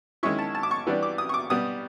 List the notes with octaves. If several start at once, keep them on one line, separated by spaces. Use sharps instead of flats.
D#3 G#3 C#4 E4 C#6
A5
A5
D6
C#6
E3 G3 B3 D4
D6
D#6
C#6
D6
B2 G3 B3 D#6